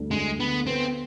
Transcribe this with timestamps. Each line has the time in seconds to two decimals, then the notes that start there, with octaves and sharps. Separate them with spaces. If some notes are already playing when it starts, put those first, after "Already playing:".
Already playing: D2 G3
0.11 D2 G#3
0.39 D3 B3
0.67 B3 C4